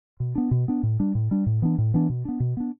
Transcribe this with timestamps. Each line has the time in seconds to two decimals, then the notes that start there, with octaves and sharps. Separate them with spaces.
0.20 B2
0.35 B3 D4
0.51 B2
0.68 B3 D4
0.83 A2
1.00 G3 D4
1.15 A2
1.31 G3 D4
1.46 A2
1.62 E3 B3 D4
1.78 A2
1.94 E3 B3 D4
2.10 B2
2.25 B3 D4
2.40 B2
2.57 B3 D4